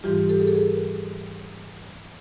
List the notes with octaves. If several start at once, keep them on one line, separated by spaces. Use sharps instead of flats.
G#2 E3 G3 F4 G4
G4 A4
G#4
A4
G#4 A#4